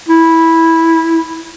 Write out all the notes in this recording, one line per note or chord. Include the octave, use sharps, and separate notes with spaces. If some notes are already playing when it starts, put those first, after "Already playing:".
E4